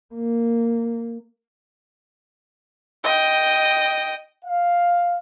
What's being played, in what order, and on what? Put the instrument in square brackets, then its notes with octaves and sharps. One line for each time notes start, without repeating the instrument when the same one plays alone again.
[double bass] A#3
[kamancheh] D#5 G5
[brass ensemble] F5